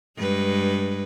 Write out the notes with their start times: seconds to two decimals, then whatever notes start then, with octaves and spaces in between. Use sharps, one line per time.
0.17 G2 G#3 B4